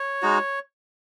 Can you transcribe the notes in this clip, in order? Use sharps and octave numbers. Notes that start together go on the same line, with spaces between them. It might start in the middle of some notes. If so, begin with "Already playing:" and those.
Already playing: C#5
G#3 D#4 F#4